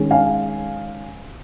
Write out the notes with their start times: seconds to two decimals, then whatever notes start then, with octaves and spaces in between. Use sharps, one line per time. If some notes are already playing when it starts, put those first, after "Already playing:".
Already playing: D#3 G#3 C#4
0.11 F5 G#5